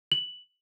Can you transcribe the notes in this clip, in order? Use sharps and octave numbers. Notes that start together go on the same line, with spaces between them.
F#7